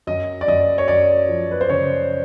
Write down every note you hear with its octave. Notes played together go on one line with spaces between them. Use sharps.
F#2 D#5
D5
F#2 D#5
C#5
F#2 D5
F3
B4
C5
C#3 C#5